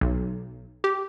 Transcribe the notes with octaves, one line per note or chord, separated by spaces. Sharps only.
B1
G4